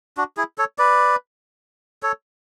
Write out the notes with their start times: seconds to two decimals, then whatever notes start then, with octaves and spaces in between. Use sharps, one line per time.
0.17 D4 F#4
0.37 E4 G#4
0.58 A4 C#5
0.78 B4 D5
2.03 A4 C#5